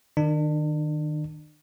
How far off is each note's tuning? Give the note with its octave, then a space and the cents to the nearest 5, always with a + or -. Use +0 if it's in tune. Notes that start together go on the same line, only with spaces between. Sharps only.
D#3 -20 D4 +35